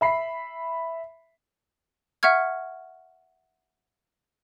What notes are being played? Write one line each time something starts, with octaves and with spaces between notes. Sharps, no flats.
E5 B5 C7
E5 F#5 C#6 F6 G#6